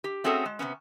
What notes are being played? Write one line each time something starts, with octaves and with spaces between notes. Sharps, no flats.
G4
A3 C4 C#4 F#4 G#4 A4
G#3
C3 D#3 B3 C#4